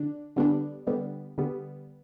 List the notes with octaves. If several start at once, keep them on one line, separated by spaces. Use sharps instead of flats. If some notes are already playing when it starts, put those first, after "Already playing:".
Already playing: D3 D4
D3 G3 B3 D4
D3 G3 B3
D3 G3 B3